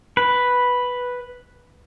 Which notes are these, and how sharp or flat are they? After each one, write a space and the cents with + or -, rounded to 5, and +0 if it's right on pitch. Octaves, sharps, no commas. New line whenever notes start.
B4 +0